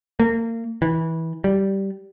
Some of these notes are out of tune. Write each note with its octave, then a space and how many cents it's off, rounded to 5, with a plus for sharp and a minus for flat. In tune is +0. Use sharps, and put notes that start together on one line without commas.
A#3 -30
E3 -20
G3 -10